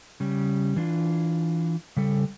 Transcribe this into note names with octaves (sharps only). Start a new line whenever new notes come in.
C#3 G3
E3 D4 F4
C#3 G3 A4